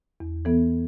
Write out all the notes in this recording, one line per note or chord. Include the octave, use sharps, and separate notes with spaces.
E2
E3 B3 A4